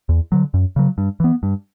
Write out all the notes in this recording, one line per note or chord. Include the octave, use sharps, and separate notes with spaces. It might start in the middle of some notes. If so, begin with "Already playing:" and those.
E2
D3 F#3
F#2
C#3 F#3
G2
E3 B3
G2